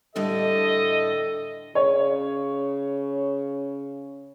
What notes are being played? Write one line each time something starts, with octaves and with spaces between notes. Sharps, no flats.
A2 D3 G3 A4 D#5
C#3 C#5